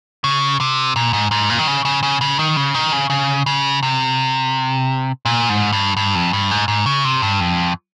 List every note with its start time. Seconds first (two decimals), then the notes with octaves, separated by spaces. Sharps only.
0.24 C#3
0.60 C3
0.96 A#2
1.13 G#2
1.31 G#2
1.50 A#2
1.59 D#3
1.67 C#3
1.85 C#3
2.03 C#3
2.21 C#3
2.39 D#3
2.57 C#3
2.74 D#3
2.93 C#3
3.10 C#3
3.46 C#3
3.83 C3
5.26 A#2
5.49 G#2
5.72 G2
5.97 G2
6.15 F2
6.33 G2
6.51 G#2
6.68 G#2
6.86 C#3
7.05 C3
7.22 G2
7.40 F2